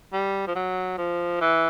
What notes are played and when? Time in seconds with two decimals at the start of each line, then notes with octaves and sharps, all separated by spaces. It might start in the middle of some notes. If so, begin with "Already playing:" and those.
0.13 G3
0.48 F3
0.56 F#3
0.98 F3
1.41 E3